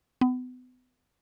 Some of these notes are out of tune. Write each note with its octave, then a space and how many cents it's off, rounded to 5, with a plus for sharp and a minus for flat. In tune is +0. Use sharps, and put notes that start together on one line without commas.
B3 +35